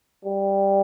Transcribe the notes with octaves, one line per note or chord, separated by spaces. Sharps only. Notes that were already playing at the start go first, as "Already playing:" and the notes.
G3